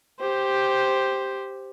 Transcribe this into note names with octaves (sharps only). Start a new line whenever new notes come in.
G4 C5